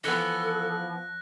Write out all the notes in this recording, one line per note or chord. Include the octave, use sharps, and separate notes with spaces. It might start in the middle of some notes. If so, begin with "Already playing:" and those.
E3 F3 B3 A4 F#6 A#6